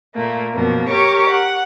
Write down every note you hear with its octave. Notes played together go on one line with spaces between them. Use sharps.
A#2 A3 A#3
F#2 B2 F3 A#3
G4 A#4 C#5 C#6 D6
F#5